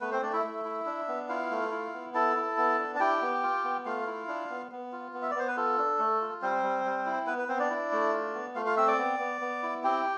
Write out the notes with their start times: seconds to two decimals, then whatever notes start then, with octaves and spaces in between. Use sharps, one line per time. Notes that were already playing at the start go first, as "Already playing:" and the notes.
0.01 A3 B3 B4
0.12 C4 C5
0.22 A3 D4 D5
0.33 E4 E5
0.44 A3
0.65 E4
0.86 D4
1.08 B3
1.29 E4 F4 F5
1.51 A3
1.71 E4
1.93 B3
2.14 E4 A4 A5
2.36 E4
2.57 B3
2.79 D4
2.96 A5
3.00 E4 G4 G5
3.22 B3
3.43 F4
3.64 B3
3.85 A3 F4 F5
4.07 E4
4.28 D4
4.50 B3
4.72 B3
4.92 F4
5.14 B3
5.22 E5
5.31 D5
5.35 B3 C5
5.48 B4
5.57 F4 A4
5.78 D4
5.99 A3
6.21 F4
6.42 G3 C4 C5
6.63 G3
6.85 G3
7.06 E4
7.27 B3 B4
7.38 B4
7.48 B3 C4 C5
7.59 D4 D5
7.70 E4
7.92 A3
8.13 F4
8.34 B3
8.55 A3 F4 F5
8.66 F4 F5
8.76 C4 E5 E6
8.87 D5 D6
8.99 B3
9.19 B3
9.41 B3
9.63 E4
9.84 C4 G4 G5